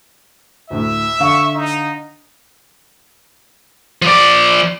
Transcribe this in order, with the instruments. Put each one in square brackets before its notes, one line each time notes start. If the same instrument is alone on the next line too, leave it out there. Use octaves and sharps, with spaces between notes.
[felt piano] D2 A2 [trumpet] E5
[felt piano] D3 F5 [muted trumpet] C#6
[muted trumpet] D#4
[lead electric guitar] F3 D5